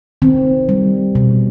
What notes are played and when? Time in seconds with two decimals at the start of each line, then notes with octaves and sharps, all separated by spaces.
0.22 D#3 C4
0.69 G3
1.15 B2